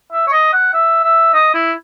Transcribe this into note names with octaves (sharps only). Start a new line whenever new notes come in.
E5
C#5
D#5
F#5
E5
E5
D#5
E4